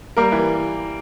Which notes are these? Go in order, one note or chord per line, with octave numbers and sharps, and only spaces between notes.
G3 A#3 A#4
E3